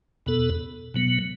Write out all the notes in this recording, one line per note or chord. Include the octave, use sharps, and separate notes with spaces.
E2 B2 B3 A4
B2 F#3 B3